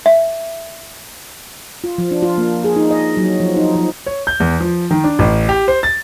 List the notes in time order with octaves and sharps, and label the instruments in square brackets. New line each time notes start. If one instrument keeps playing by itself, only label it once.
[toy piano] E5
[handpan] F4
F3
D4
F4
A#3
G#4
D#4
D#5
F#3
F3
D#4
F3
[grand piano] C#5
G6
E2
F3
D#3
D4
A1
G4
C5
A6